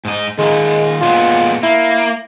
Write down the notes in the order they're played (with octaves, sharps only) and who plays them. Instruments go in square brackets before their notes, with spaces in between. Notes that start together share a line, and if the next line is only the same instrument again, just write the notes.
[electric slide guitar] G#2 D#5
[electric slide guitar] D#3 F4 [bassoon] G#3
[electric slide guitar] A#2 G#3 B3 [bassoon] F4
[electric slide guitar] A#3 [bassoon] E4